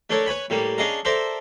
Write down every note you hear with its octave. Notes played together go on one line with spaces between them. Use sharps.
A3 D4 A4 A#4 C#5
B4 C#5 G#5 B5
A2 G3 A#3
C#4 D4 G#4 D#5 F5 A#5
A4 A#4 C5 D5 E5 A#5